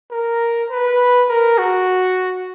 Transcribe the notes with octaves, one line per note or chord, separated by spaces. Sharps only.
A#4
B4
A#4
F#4